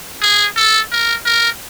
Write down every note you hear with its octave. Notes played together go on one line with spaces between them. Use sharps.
G#4
A4
A#4
A#4